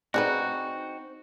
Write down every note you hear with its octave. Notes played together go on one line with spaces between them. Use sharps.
C4 D4 D#4 F#4 G#4 B4